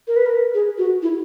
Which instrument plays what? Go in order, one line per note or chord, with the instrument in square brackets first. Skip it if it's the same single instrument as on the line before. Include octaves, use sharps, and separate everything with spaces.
[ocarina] A#4
B4
A#4
G#4
F#4
E4